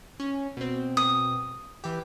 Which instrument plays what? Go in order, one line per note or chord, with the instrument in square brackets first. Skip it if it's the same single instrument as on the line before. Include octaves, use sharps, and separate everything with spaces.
[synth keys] C#4
B2 C4
[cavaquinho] D#6
[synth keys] E3 G4